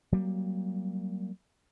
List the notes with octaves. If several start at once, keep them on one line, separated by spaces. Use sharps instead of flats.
F#3 G3 A#3